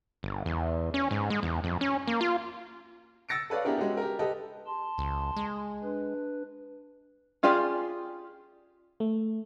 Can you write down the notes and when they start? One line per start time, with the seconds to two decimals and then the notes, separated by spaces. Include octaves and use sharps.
0.23 G1
0.46 E2
0.94 C#4
1.11 G#2
1.30 G#3
1.43 E2
1.64 F2
1.81 C#4
2.07 A#3
2.21 F4
3.29 E6 A6 A#6 C#7 D7
3.50 A4 B4 C#5 D5 F5
3.65 B3 D4 E4 G4 G#4 A#4
3.77 G#3 C#4 F#4 G4
3.97 G4 A#4
4.19 G4 A4 B4 D#5
4.67 A5 C6
4.98 C#2
5.36 G#3
5.83 D4 B4
7.43 C#4 F4 G4 G#4 D5
9.00 A3